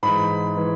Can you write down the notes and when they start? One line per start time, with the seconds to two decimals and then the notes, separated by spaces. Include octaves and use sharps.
0.03 G#2 E3 B5
0.57 E3